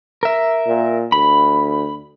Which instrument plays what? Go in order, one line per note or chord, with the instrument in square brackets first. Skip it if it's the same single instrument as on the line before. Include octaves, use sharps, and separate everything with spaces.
[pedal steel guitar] A#4 E5
[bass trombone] A#2
[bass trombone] D2 [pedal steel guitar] B5